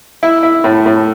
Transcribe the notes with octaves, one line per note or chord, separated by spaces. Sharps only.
E4
E4
A2
A2